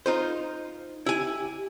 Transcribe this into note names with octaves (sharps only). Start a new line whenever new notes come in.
D#4 F4 C5
E4 G4 G#5